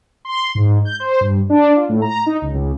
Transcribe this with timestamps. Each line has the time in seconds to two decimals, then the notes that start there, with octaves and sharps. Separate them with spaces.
0.25 C6
0.55 G#2
0.85 G6
1.00 C5
1.21 G2
1.50 D4
1.76 F4
1.89 A2
2.02 A#5
2.26 D#4
2.42 C#2
2.54 C#2